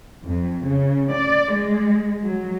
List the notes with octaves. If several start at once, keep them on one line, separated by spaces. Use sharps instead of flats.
F2
C#3
D5
G#3
F#3